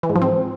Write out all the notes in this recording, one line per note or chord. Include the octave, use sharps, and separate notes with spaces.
E3
G#2
F3
C4